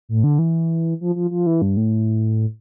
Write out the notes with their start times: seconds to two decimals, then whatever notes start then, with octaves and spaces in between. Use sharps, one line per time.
0.09 A2
0.24 D3
0.39 E3
1.01 F3
1.16 F3
1.31 F3
1.46 E3
1.62 G2
1.77 A2